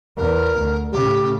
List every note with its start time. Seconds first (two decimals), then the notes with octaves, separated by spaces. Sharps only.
0.17 E2 A#4
0.58 D2
0.92 A2 C#3 G4